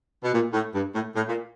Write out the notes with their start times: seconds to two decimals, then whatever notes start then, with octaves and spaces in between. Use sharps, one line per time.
0.24 B2
0.33 A#2
0.53 A2
0.74 G2
0.94 A2
1.15 A2
1.29 A#2